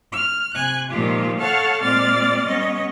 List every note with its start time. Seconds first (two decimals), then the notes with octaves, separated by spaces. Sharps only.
0.13 F6
0.54 C3 G#5 F#6
0.90 A#2 D#3 F3 G#3 F4 G4
1.37 A4 C#5 F5 F#5 A5 F6
1.81 A#2 G#3 C4 D5 F6 A6
2.46 G3 B3 C#4 D#5